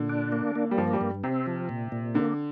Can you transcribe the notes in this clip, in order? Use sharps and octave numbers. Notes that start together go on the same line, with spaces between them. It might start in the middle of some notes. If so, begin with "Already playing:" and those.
Already playing: A#2 D3
D4
A#3
A#3
G3
G2 F3
G3
G2
C3 C4
F3
A#2
A#2
D3 A#3